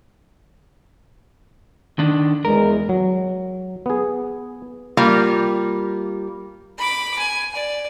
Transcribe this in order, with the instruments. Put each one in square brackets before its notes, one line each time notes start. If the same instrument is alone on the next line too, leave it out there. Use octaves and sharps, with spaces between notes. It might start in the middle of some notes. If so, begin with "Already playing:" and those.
[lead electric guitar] D#3 D4
[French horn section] E2 G#3 [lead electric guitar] A#4
[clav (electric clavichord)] F#3
B3 G#4
[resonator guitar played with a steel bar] G3 A#3 F4
[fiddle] B5 D6
G#5
D5